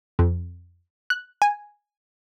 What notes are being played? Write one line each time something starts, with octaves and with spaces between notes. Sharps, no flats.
F2
F#6
G#5